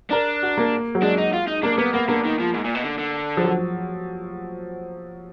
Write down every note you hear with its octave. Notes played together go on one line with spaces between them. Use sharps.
D4 A#4
F#4
A#3
F#3
G#3 D4
D#4
F4
D#4
A#3 D4
A#3 B3
A#3 B3
D3 A#3
D#3
F3
G#2
A#2
B2
D3
D3
F3
F#3